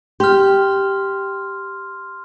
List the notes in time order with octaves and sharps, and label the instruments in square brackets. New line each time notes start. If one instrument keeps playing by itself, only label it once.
[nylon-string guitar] G4 [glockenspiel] C6 F6